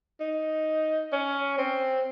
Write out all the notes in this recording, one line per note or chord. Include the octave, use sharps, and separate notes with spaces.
D#4
C#4
C4